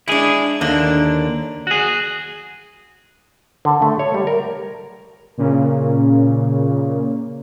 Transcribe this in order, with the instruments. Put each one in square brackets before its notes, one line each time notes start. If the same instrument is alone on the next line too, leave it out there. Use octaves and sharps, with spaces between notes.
[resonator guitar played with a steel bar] G#3 D4 [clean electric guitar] E4 G#4
[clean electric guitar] D#2 D3 [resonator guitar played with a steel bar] A#3 D4
[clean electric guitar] F#4 G#4
[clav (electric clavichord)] D3
A3
C#5
G3
A#4
[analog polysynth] A#2 C#3 C#4